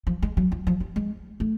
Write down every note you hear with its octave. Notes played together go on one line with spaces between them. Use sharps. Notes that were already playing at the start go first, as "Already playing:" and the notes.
F3
G#3
F#3
F3
F3
G3
G#3
A3